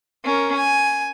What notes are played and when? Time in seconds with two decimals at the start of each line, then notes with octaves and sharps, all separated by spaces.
0.24 C#4 A#4
0.55 G#5